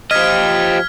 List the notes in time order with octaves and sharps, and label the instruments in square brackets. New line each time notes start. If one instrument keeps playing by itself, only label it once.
[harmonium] F3 [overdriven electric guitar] G4 D#5 [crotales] F6 G#6 B6